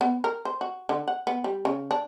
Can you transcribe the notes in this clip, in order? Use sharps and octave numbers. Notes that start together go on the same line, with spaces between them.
B3
A#4
C5
F#4
D3
F#5
B3
G3
C#3
D4